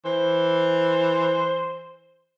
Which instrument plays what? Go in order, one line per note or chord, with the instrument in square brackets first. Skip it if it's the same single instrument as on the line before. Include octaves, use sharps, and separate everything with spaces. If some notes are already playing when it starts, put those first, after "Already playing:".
[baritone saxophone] E3 [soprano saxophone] C5